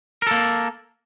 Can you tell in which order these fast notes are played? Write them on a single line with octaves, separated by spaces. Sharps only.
A#4 A4 A#3